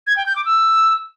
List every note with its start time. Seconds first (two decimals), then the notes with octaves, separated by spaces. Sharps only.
0.07 G#6
0.17 G5
0.26 G6
0.36 D6
0.45 E6